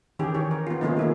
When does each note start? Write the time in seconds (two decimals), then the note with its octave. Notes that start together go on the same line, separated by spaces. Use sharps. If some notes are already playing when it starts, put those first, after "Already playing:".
0.19 D#3 E3 C#4 G4 G#4
0.35 G4 C#5
0.51 A#4
0.67 B3 F4
0.81 D#3 F3 A3 A#3 C#4 D#4
0.97 A#3 E4 G#4